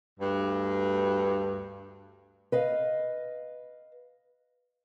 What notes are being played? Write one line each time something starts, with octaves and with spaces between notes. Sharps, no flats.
D2 G2
B4 D#5 F5